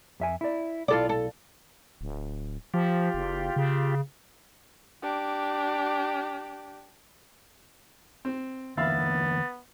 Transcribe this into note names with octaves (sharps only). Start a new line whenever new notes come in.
F2 E5 G#5
E4 D5
B1 E4 F4 A4 D5
A4
D1
F3 F4 G4
F#1
C#3
D4 G4
C4
D3 E3 A#3 B3 E5 F5 B5 A6